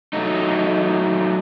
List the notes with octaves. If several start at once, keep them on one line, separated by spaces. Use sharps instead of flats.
F#3 A3 D#4